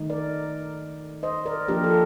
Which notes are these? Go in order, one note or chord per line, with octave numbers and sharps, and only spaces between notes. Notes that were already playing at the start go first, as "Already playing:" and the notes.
Already playing: D#3 A3 D#4
A#4 D5
C5 D#5
A#4 D5
F3 A#3 D4 G4 A#4
F4 A4